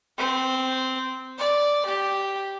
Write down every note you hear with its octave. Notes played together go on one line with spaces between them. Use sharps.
C4
D5
G4